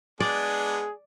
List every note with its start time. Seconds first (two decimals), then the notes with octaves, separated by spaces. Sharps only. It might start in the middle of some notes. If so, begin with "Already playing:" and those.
0.20 G#3 B3 D4 G#4 D5